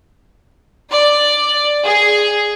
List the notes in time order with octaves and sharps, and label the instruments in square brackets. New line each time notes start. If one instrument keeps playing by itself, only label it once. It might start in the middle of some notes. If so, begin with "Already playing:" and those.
[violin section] D5
G#4